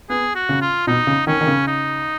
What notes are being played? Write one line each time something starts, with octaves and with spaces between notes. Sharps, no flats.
B3 G#4
F#4
C#3
F4
B2 D#4
C#3
D#3 C#4
D#3
C#3
D#4